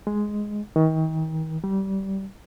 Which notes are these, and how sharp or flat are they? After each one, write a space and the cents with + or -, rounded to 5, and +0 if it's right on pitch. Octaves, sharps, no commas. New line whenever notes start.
G#3 +5
D#3 +35
G3 -20